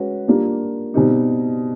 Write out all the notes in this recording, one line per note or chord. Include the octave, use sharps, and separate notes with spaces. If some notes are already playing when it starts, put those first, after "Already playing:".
Already playing: G#3 C#4 F#4 B4
G3 A#3 D4 F4
B2 G3 C4 D#4